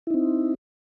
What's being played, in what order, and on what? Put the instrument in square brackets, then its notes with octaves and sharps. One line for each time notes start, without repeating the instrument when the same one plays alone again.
[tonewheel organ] E4
D#4
C4